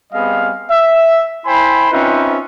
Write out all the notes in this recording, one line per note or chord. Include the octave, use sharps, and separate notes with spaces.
G3 B3 C4 G#4 D#5 F5
E5
E4 C5 G5 G#5 B5
C4 C#4 D#4 F4 B4 E5